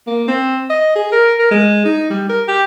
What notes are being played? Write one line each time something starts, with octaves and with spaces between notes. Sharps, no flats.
A#3
C4
D#5
G#4
A#4
A#4
G#3
D#4
G3
A#4
G4